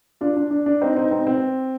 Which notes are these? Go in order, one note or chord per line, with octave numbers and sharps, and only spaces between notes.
D4 F4
D4
D4
D4
C4 D#4
C4 D#4
C4 D#4
C4